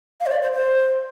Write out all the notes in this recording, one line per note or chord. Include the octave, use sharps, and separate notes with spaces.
F5
C5
D5
C5
C5